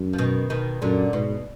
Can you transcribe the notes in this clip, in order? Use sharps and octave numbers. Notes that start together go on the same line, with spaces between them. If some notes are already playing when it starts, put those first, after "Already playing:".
Already playing: F#2
F3
B2 D#3
B2 D#3
F#2 A#2 D3
G#2 B2